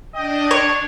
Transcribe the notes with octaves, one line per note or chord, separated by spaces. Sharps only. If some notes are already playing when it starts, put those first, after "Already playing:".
D4 D#5 G5
C#5